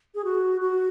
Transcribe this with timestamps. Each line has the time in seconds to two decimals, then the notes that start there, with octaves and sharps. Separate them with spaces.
0.15 G#4
0.24 F#4
0.61 F#4